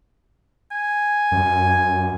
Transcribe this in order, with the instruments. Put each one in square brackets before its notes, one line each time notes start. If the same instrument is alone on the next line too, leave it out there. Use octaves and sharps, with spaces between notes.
[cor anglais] G#5
[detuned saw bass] F#2